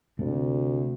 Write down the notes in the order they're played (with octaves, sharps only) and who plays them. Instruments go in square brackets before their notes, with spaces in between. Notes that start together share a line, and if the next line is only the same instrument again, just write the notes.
[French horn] D2 [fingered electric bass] C3 A3